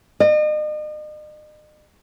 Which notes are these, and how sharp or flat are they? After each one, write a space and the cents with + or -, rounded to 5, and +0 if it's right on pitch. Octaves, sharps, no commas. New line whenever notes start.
D#5 -40